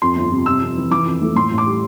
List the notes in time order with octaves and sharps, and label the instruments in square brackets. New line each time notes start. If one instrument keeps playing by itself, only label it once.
[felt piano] F2 C6
G1
C3
C3 E6
F2
E3
E3 D6
F2
A3
A2 C6
A1
D6
G3